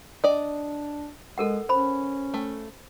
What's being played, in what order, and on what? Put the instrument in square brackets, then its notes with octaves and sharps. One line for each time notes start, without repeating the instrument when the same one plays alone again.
[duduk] D4 [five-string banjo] D5 D#5
[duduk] G#3 [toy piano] A4 A#4 F#5
[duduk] C#4 [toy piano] C5 B5
[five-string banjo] A3